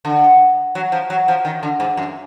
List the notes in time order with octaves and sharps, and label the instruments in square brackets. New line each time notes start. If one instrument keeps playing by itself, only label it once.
[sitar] D3
F#3
F3
F#3
F3
D#3
D3
G#2
F#2